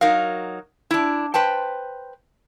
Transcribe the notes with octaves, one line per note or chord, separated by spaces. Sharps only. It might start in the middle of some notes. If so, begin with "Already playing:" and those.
F#3 D#4 A#4 F5
D4 E4
B4 C5 G5 A5